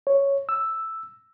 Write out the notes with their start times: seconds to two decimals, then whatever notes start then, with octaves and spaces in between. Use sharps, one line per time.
0.07 C#5
0.49 E6